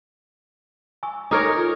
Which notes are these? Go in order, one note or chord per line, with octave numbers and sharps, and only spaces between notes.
G#5 C#6 E6
D#4 A4 A#4 C#5 D6 D#6
F4 A4